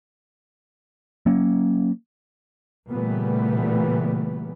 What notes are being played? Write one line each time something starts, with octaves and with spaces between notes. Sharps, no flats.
F#3 A#3 C#4
A#2 C#3 E3 G3 A3 B3